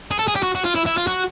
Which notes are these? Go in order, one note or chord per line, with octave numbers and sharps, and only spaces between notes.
G#4
A4
G#4
G4
F#4
F#4
F4
E4
E4
F4
F#4